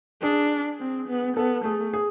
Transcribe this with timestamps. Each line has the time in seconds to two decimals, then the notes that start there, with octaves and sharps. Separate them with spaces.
0.22 D4 G#4
0.80 C4
1.09 B3
1.37 B3 A4
1.65 A3 G#4
1.93 G#4